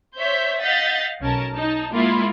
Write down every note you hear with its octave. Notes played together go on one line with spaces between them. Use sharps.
C5 C#5 E5 G6 B6
D#5 F5 F#5 G6 A6 B6
B1 C#4 A#4 A5
D#4 A5
G#3 A#3 E4 F4